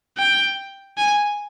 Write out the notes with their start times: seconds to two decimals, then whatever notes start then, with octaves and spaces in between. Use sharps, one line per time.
0.18 G5
0.97 G#5